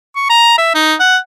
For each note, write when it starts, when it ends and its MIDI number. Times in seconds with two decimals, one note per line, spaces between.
0.16 0.27 85
0.30 0.58 82
0.58 0.74 76
0.75 0.94 63
1.00 1.17 78